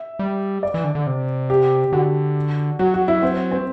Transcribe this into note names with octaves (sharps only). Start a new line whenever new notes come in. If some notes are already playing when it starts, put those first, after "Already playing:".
Already playing: E5
G3
D5
E3
D3
D3
C3
G4
D3 F#4
F#3 F#4
F#4
E4
C4
C4